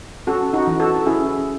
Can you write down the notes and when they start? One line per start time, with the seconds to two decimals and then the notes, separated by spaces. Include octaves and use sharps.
0.27 C#4 F#4 A4
0.53 D#4 F#4
0.67 E3
0.80 F#4 A4
1.06 C#4 E4 G#4